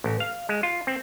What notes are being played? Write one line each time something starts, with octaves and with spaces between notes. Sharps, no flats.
A1
F5
G#3
F4
C4